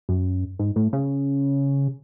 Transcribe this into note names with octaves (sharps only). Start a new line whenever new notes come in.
F#2
G#2
A2
C#3